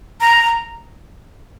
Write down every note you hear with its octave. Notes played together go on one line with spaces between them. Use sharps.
A#5